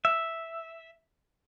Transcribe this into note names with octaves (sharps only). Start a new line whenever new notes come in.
E5